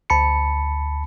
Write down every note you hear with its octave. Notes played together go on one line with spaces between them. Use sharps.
D2 A5 B5 C#7